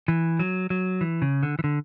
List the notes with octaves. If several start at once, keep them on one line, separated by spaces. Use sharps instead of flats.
E3
F#3
F#3
E3
C#3
D3
E3
D3